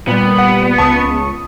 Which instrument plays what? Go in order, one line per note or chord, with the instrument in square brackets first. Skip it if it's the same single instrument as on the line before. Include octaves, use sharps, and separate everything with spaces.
[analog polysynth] A#2 G3 [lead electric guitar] B3
[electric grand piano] F#5
[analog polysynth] C#2 C#6 [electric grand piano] A5 D#6